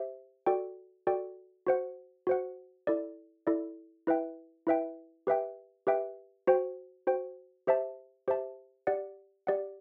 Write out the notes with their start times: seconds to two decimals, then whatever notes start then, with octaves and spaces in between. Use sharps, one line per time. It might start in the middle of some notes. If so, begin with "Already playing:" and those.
Already playing: G4 C5 E5
0.46 F#4 A4 D5 G5
1.07 F#4 A4 D5 G5
1.67 F#4 C5 F#5
2.27 F#4 C5 F#5
2.87 E4 A4 D5
3.47 E4 A4 D5
4.07 E4 B4 E5 G5
4.67 E4 B4 E5 G5
5.27 G4 B4 E5 G5
5.87 G4 B4 E5 G5
6.47 F#4 C5 G5
7.07 F#4 C5 G5
7.67 G4 C5 E5 A5
8.28 G4 C5 E5 A5
8.87 G4 D5 F#5
9.47 G4 D5 F#5